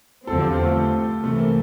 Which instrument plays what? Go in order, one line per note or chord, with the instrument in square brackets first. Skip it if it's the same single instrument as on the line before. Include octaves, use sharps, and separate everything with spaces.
[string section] E2 D3 F3 C4 [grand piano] A4
[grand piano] G4
F4
A3
[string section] C2 C3 E3 [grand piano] A3
[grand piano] A#3